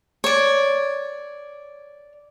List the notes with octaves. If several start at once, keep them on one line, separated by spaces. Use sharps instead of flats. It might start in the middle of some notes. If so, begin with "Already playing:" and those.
C#5 D5